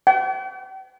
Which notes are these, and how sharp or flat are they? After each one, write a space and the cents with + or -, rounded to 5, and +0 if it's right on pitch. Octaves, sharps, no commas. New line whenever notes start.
G5 -45